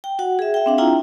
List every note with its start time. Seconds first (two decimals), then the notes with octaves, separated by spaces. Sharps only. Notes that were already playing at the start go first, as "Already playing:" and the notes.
0.04 G5
0.19 F#4 F#5
0.39 G#4 E5
0.54 E5 G5
0.66 C4 D4 F5
0.78 D4 E4 F4 G5 A#5